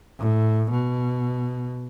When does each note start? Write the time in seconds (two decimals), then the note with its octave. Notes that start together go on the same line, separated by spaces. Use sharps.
0.19 A2
0.71 B2